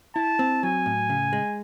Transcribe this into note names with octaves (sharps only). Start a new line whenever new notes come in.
E4 A5
C4
F#3 G#5
A2
C#3
G#3